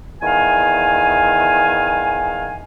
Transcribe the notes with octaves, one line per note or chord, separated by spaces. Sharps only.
E2 D#3 F5 G#5